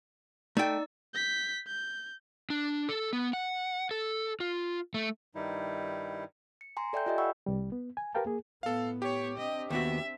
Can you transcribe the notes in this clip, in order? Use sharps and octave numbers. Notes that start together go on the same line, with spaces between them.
A3 D#4 D5 G5 E6
G6 B6
G6
D4
A4
B3
F#5
A4
F4
A3
G2 D#3 G3 D#4 E4
C#7
G#5 A#5 C6
A4 D5 E5 G5 G#5 G6
F4 G4 D#5 E5 G#5
F#5 G5 B5 C#6 E6
C2 G3
B3
G#5
G4 A#4 B4 F5 G5 A5
A#3 G#4
A2 B3 A4 F5
G4 C#5
C4 D4 D#5
D#2 B3 F#4 E5